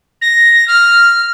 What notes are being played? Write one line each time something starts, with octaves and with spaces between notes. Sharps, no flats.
A#6
F6